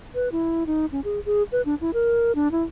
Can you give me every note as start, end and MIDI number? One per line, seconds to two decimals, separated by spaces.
0.15 0.29 71
0.32 0.64 64
0.67 0.86 63
0.92 1.00 61
1.04 1.20 68
1.26 1.43 68
1.52 1.62 71
1.65 1.75 62
1.81 1.91 64
1.94 2.32 70
2.35 2.51 62
2.52 2.63 64